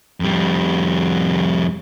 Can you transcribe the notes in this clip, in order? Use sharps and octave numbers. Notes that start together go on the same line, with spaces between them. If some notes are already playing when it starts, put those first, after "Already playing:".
F2 G3